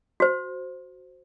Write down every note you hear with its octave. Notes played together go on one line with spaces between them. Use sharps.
F#4 C5